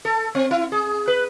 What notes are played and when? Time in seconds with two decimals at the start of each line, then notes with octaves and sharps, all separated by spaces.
0.05 A4
0.35 C4
0.51 E4
0.72 G#4
1.08 B4